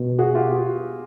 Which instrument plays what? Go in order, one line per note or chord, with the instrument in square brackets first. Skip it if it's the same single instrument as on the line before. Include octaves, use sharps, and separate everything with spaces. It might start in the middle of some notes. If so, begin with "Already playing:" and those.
Already playing: [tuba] B2
[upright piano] F#4 G#4
F4 G4